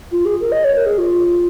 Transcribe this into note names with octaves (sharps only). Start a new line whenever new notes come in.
F4
G#4
A#4
D#5
C#5
A#4
G#4
F4